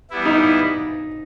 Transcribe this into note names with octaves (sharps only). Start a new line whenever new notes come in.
E3 G3 B3 E4
D#4